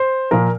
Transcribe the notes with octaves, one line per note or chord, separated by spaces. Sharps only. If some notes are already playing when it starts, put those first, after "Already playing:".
Already playing: C5
A#2 F3 A#4